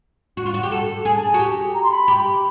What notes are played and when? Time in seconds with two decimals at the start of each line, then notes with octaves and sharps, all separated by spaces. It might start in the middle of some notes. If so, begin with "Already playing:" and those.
0.37 F#4
0.46 F4
0.54 F#4
0.63 G4
0.71 A4 F#5
1.05 G#4 G#5
1.15 A5
1.26 G#5
1.34 F#4
1.39 G4
1.74 A#5
1.83 C6
1.91 B5
2.08 G4